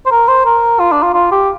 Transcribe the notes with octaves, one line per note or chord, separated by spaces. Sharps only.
C5
A#4
C5
A#4
F4
D4
F4
F4
G4